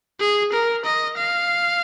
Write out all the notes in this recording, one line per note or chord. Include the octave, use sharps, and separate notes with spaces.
G#4
A#4
D#5
F5